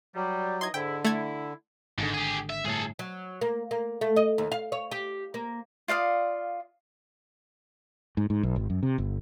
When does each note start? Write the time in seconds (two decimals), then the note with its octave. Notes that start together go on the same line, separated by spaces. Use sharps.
0.15 F#3 G3
0.61 E3 D#4 D#5 C6 G#6
0.74 G#2 D3 E4 G5
1.05 A3 E4 G#6
1.98 G#1 G#2 D3
2.14 G4 G#4
2.50 E5
2.64 G1 A2 G#4 A4
2.99 F#3
3.41 A#3
3.71 A#3
4.01 A3
4.16 D#5
4.38 D#2
4.52 F5
4.72 C#5
4.91 G4
5.34 A#3
5.88 F4 D5 F5 D#6
8.17 G#2
8.30 G#2
8.43 B1
8.56 G#1
8.70 F#2
8.83 C3
8.98 G1